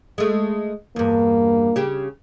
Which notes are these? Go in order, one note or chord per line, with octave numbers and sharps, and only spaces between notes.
G#3 A3
E2 G2 A#3
C#3 G4